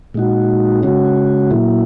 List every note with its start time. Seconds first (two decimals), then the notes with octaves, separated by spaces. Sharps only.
0.14 A#2 G#3 D#4 F#4
0.83 C#3 G#3 C#4 F#4
1.51 A#2 F#3 A#3 E4